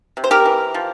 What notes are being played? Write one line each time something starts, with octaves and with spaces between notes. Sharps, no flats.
C3
C5
G4 A#4
E3
F3